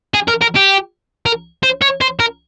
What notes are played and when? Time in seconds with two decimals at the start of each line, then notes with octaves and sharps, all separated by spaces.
0.14 G#4
0.28 A#4
0.41 A#4
0.55 G4
1.26 A#4
1.63 C5
1.82 C#5
2.01 C5
2.20 A#4